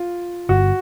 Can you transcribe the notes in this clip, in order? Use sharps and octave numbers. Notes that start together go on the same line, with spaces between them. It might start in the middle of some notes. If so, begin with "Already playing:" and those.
Already playing: F4
G1 G2 D3 F#4